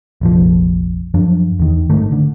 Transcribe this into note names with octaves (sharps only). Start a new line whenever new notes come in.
F1 A#1 F3
F#2 F3 D4
E2 D#3
G#2 D#3 A3
D3